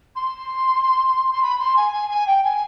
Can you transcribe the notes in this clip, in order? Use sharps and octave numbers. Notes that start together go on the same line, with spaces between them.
C6
C6
B5
C6
G#5
G#5
G#5
G5
G#5